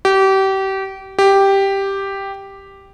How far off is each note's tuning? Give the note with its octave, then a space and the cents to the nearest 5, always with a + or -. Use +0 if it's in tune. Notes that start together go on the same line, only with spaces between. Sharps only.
G4 -30
G4 +0